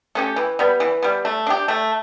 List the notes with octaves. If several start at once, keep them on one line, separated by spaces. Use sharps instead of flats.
A3 C#4 G4
E3
G3 B3
E3
G3 B3
A3
D4 G4
A3